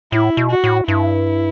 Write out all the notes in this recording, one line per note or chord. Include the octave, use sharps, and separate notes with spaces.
A2 E4
B2
F#4
A2
G2 E4